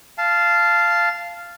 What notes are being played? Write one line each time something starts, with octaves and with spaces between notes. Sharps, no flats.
F5 A5